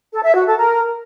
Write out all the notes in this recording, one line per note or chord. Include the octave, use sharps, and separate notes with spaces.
A4
E5
F#4
A4
A#4